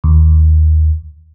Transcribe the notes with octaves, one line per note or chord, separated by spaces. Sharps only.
D#2